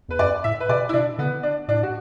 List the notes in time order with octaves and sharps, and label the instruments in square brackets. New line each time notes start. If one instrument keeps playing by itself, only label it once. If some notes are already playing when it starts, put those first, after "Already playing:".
[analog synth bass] E2 [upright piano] B4
[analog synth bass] F#2 [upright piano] D5
[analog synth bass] A2 [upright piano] E5
[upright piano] B4
[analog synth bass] B2 [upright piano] D5
[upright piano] E4
[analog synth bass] B2 [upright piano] D4
[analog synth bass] D3 [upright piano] B3
[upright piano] D4
[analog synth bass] A2 [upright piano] D4
[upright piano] F#4